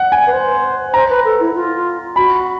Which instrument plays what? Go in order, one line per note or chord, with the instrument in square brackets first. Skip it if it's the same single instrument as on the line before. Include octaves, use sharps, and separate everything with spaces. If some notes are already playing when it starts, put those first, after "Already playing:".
Already playing: [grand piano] F#5
G#5
[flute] B4
C5
[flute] C5 [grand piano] A#5
[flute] B4
A4
E4
F4
[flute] F#4 [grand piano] B5